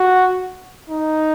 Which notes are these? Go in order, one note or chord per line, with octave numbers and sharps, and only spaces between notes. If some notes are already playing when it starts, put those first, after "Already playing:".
Already playing: F#4
D#4